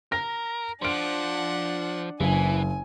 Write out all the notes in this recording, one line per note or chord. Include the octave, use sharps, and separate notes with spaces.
A#4 A#6
F3 D4 F#5 C6 D7
F#1 E3 G#5